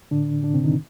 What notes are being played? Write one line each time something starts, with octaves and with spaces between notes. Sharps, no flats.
A2 D3 D4
A2 D3 D4
C3 C4
D#3 D#4